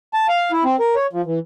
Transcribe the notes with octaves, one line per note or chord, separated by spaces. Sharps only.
A5
F5
E4
C4
A#4
C#5
F3
E3